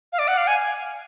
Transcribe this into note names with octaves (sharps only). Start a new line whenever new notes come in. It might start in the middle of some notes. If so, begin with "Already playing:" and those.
F5
D5
F#5
F5
G#5